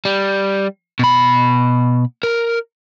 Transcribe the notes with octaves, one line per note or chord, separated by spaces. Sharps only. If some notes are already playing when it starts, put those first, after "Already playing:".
G3
B2 B5
A#4